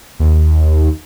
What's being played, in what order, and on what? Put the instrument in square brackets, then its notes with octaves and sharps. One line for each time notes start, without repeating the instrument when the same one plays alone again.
[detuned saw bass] D#2